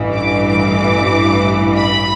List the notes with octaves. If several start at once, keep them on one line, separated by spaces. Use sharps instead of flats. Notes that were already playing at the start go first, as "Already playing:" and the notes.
Already playing: A1 G2 E3
D6
D6
B5